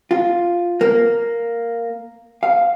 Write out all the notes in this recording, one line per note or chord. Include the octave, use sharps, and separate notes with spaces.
F4
A#3
F5